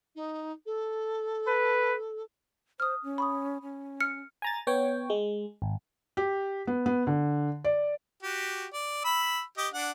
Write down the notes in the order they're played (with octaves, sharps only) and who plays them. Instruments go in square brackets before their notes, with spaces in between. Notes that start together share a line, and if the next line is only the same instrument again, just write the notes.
[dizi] D#4
A4
[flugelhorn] B4
[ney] C5 [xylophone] D#6 F6
[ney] C#4
[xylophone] B5 C#6 D#6
[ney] C#4
[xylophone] F6 C#7
[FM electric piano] G#5 A#5 A6
B3 C#5 G5
G#3
G#1
[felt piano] G4
B3
B3
D3
D5
[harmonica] F#4 G4
D5
B5 E6
G4 D#5
D4 F#5